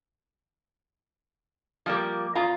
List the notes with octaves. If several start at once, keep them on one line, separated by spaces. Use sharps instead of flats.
F3 G3 A#3
E2 F4 A#5